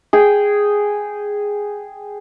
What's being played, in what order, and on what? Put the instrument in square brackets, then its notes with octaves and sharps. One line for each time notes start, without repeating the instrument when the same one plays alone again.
[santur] G#4 G5